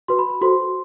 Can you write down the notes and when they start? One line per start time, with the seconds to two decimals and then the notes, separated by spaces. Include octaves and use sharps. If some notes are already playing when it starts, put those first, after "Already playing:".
0.08 F#4 B4 C6
0.19 B5
0.30 B5
0.41 F#4 A4 C5 C6